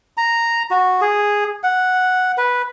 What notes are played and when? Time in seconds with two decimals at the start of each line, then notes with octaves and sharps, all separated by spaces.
0.17 A#5
0.71 F#4
1.01 G#4
1.64 F#5
2.38 B4